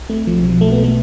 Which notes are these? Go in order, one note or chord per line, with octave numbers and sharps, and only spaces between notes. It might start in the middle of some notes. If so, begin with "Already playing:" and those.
Already playing: B1
A3 C4
B1 F3
F3
B2
F3
B2 A3
B3
A3